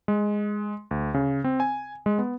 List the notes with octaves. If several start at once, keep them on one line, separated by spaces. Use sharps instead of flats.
G#3
D2
C#3
C4
G#5
G#3
B3